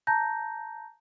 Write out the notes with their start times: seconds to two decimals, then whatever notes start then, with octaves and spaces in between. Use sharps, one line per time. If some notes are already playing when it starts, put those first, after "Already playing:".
0.07 A5 A#5 G6 A#6